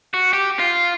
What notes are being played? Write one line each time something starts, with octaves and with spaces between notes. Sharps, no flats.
F#4
G4
F4